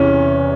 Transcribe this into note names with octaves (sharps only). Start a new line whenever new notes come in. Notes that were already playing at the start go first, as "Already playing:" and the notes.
Already playing: E2 C3 E3 C#4